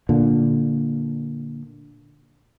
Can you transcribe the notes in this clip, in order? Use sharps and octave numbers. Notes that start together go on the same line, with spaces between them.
A#2 D3